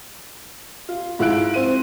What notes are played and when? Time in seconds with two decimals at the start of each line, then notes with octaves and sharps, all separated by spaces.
0.89 F4
1.19 G#2 F3 E4 F4 F#6 D7
1.54 C4 C5 D#7